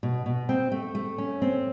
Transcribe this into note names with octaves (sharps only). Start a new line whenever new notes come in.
B2
B2
C4
A3
A3
C#4
C4